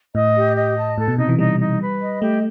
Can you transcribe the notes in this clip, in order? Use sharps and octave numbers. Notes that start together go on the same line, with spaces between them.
A2 D#5
G4
D#5
A5
A2 A4
B2
C3 D#4
E3
G3 D#4
D#4
B4
D#5
A3 G4